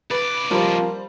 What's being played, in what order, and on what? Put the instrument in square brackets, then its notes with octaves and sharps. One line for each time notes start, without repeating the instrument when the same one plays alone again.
[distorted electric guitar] C#2 D5 [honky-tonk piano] B4
[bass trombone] F3 [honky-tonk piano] G3 C5 [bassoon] A#3